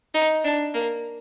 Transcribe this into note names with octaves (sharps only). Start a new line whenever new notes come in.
D#4
D4
A#3